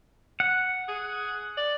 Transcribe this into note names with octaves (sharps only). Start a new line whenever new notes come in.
F#5
G#4
D5